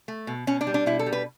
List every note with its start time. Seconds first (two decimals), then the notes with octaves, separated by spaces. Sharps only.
0.08 A3
0.27 B2
0.47 B2 C#4
0.61 D4
0.67 G3
0.74 D4
0.86 B2 E4
0.99 A4
1.06 G3
1.13 B4